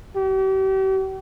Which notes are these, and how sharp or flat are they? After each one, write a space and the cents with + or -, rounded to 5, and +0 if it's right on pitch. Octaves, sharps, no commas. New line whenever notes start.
G4 -40